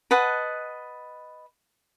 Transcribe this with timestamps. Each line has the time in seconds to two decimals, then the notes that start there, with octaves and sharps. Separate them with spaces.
0.11 B4 D#5 F#5 A5